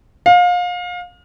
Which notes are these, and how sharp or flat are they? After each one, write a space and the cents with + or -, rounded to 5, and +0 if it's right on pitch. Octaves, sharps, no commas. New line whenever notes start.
F5 +30